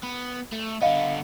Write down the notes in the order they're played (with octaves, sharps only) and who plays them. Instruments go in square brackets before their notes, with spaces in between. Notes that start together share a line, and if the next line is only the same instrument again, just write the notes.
[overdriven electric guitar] B3
A3
[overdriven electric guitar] D3 B3 [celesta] D#5 F5